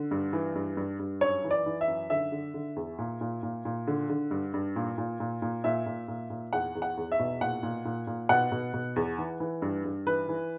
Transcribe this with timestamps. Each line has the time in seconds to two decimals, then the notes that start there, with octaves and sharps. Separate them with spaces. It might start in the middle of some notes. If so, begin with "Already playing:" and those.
Already playing: D3
0.11 G2
0.33 E3
0.55 G2
0.77 G2
0.99 G2
1.21 F#2 C#5
1.44 E3
1.51 D5
1.66 E3
1.81 E5
1.88 F#2
2.10 D3 E5
2.32 D3
2.54 D3
2.76 E2
2.98 A#2
3.21 A#2
3.43 A#2
3.65 A#2
3.87 D3
4.10 D3
4.31 G2
4.54 G2
4.76 A#2
4.98 A#2
5.20 A#2
5.42 A#2
5.64 A#2 E5
5.86 A#2
6.08 A#2
6.30 A#2
6.53 E2 F#5
6.75 E2
6.82 F#5
6.97 E2
7.12 E5
7.19 B2
7.41 A#2 F#5
7.63 A#2
7.85 A#2
8.07 A#2
8.29 B2 F#5
8.52 B2
8.74 B2
8.96 E2
9.18 E3
9.40 E3
9.62 G2
9.85 G2
10.07 E3 B4
10.29 E3